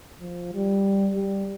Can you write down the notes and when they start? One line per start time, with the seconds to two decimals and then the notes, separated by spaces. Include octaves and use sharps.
0.21 F3
0.53 G3
1.16 G3